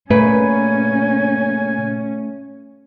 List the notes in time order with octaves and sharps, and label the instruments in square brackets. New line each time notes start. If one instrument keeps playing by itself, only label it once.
[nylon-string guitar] A#2 C#3 B4 [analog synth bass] A3 [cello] C#4 [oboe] G#5